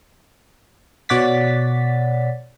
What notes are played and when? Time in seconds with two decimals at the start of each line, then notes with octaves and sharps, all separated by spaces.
1.09 B2 C#5 D5 F#5 A6 B6